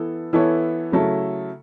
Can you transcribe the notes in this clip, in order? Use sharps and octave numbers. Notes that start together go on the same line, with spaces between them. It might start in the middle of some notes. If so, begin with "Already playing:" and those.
Already playing: E3 B3 E4 A4
E3 B3 E4 A4 C#5
C#3 F#3 A3 E4 A4